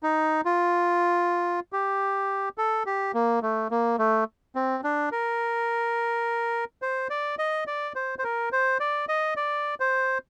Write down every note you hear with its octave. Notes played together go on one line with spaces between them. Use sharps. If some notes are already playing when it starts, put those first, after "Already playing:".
D#4
F4
G4
A4
G4
A#3
A3
A#3
A3
C4
D4
A#4
C5
D5
D#5
D5
C5
C5
A#4
C5
D5
D#5
D5
C5